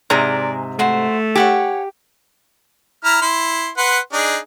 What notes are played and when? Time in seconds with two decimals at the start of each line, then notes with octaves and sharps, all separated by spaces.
0.10 G#2 C3 G#4 D5 A#5
0.79 A3 F#4 C5
1.35 G4 C#5 F#5 G#5
3.05 E4 A#5 F6
3.22 E4 C6
3.77 B4 F#5 C6
4.13 D4 D#4 G#4